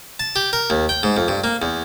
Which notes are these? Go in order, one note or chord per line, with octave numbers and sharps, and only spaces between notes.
A5
G4
A#4
D#2
G5
G#2
F2
G2
A#3
E2